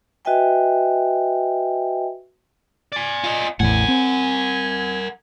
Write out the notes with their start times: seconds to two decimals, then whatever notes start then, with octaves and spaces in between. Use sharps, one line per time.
0.25 F#4 B4 D#5 E5 G5 G#5
2.92 D5 G#5
3.24 F4 D#5
3.60 A1 E2 A2 A#4 F#5 G#5
3.88 C4